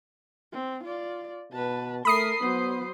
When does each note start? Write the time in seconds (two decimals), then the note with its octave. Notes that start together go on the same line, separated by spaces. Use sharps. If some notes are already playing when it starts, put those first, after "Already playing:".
0.53 C4
0.84 F4 D5
1.52 B2 B4 A5
2.05 A3 A#4 B5 D#6 C7
2.41 F#3 B3 C5